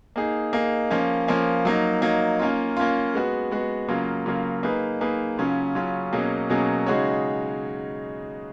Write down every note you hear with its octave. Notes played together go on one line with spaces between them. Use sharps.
A#3 D#4 G#4
A#3 D#4 G#4
F3 A#3 C#4
F3 A#3 C#4
F#3 A#3 D#4
F#3 A#3 D#4
A#3 C#4 F4
A#3 C#4 F4
G#3 B3 F#4
G#3 B3 F#4
C#3 F#3 A#3 F4
C#3 F#3 A#3 F4
A#3 D#4 G#4 B4
A#3 D#4 G#4 B4
C#3 F#3 C#4 F4
C#3 F#3 C#4 F4
B2 F#3 A#3 C#4 G#4
B2 F#3 A#3 C#4 G#4
C#3 G#3 D#4 F#4 C#5